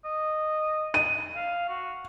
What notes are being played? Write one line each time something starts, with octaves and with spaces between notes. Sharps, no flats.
D#5
D#7
F5
F#4